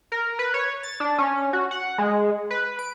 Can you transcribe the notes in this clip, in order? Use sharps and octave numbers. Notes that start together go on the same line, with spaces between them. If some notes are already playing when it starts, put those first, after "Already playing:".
A#4
B4
C#5
A6
D4
C#4
F#4
F#5
G#3
B4
D7